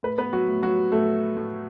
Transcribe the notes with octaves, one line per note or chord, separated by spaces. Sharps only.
A2 B4
B3 B4
F#3 F#4
A2
F#3 F#4
A2 A3 A4
A2